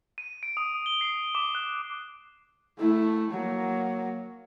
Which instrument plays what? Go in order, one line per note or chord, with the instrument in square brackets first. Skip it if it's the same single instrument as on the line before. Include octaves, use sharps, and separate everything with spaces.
[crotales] D#7
D7
D#6
G7
C7
D6
F#6
[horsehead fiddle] A3 E4
F#3 A#3